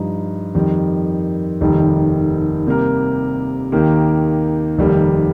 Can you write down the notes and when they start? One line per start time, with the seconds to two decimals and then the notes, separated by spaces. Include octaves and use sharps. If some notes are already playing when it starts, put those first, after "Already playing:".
Already playing: G2 F3 D#4
0.54 F2 D#3 G3
1.61 F1 D#2 D#3 G3
2.67 C3 G3 A#3 G4 A#4
3.72 D#2 D#3 A#3 G4 A#4
4.78 F1 D#2 D#3 G3 A#3